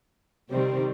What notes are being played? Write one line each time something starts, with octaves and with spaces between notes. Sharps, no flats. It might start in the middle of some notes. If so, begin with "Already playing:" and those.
C3 D#3 G3 C4